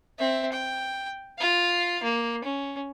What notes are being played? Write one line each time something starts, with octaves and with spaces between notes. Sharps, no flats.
C4 E5
G5
F4 F5
A#3
C#4